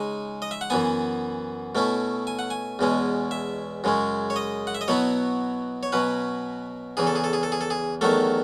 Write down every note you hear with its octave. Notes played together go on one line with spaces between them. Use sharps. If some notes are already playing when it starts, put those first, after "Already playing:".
Already playing: C#3 G#3 D#4 G#5
D#5
E5
F#5
F#2 E3 B3 G#5
B2 A3 C#4 E4
G#5
F#5
G#5
E2 B2 G#3 C#4
E5
F#2 C#3 G#3 C#4
C#5
D#5
F#5
E5
D#5
B2 F#3 B3 E4 C#5
C#5
B2 F#3 C#4 B4
E2 C#3 E3 G#4
A4
G#4
A4
G#4
A4
G#4
A4
G#4
E2 D#3 F#3 A3 A4